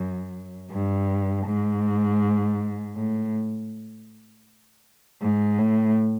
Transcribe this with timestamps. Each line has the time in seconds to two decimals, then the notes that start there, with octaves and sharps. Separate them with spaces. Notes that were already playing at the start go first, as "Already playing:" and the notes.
Already playing: F#2
0.71 G2
1.46 G#2
2.96 A2
5.21 G#2
5.58 A2